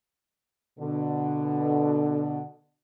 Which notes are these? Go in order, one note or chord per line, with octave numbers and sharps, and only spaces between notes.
B2 D3